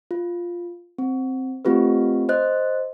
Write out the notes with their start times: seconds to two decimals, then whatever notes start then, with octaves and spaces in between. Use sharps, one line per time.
0.11 F4
0.98 C4
1.65 A3 C4 F4 G4 B4
2.29 C5 D#5 F#6